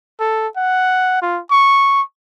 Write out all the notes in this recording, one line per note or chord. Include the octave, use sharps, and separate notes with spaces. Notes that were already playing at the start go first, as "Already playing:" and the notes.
A4
F#5
F4
C#6